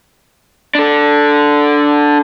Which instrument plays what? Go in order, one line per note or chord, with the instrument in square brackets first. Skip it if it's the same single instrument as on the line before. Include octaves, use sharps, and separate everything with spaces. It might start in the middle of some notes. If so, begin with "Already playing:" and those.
[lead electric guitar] D4 A4